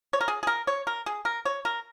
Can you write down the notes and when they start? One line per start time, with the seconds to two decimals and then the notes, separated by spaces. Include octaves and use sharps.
0.13 C#5
0.21 A#4
0.28 G#4
0.43 G#4
0.47 A#4
0.67 C#5
0.87 A#4
1.06 G#4
1.25 A#4
1.45 C#5
1.65 A#4